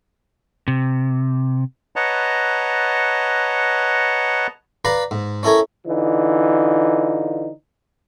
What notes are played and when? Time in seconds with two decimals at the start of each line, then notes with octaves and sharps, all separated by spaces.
0.68 C3
1.96 B4 C#5 D#5 F#5 A5 A#5
4.85 B4 D5 F5 A#5 B5
5.11 G#2
5.43 C#4 E4 A4 A#4 C#5
5.86 D3 E3 D#4 F4